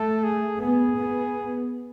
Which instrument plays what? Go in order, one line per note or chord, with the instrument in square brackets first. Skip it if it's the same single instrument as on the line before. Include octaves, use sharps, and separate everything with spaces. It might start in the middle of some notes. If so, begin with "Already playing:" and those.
Already playing: [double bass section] A3 [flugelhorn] A4
[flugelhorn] G#4
[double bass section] B3 [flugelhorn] G#4
[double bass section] B3